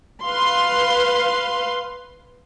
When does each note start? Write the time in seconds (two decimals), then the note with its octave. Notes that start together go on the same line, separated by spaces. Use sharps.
0.24 B4 F5 C6